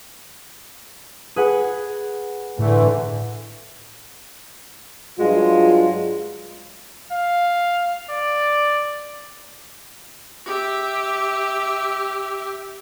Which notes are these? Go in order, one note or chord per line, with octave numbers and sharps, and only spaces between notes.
G#4 B4 F#5
A2 D3 E3 A3
G2 F#3 G#3 F4
F5
D5
G4 E5